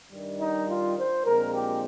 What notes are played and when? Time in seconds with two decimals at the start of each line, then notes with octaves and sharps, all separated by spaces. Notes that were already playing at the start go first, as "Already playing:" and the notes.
0.11 G2 D#3 G3
0.39 D#4
0.68 F4
0.97 C5
1.25 A#1 A#2 G#3 C4 A#4
1.54 G4